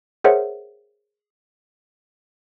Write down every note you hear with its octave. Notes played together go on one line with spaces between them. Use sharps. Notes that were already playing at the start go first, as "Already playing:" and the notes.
G#4 A#4 C5 C#5 E5 F#5